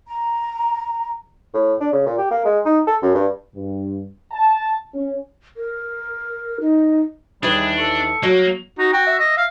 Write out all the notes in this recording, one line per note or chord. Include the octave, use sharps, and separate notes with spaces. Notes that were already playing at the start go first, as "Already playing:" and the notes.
A#5
A2
D4
C#3
A#2
G4
A#3
G#3
D#4
A4
F#2
G2
G2
A5
C#4
A#4
D#4
D#2 E3 G3 D4 G#4
A4 C#6
F#3 A#3
D#4 F#4
F#4 G5
E5
D#5
F5